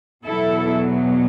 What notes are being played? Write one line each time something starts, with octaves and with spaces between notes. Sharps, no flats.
E2 B2 F#3 E4 A4